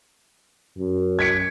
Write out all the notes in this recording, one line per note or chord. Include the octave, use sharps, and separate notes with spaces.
F#2
G#6 B6 C#7